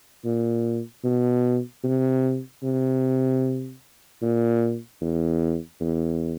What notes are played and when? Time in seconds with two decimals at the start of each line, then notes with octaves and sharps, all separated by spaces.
0.25 A#2
1.04 B2
1.84 C3
2.63 C3
4.22 A#2
5.01 E2
5.80 E2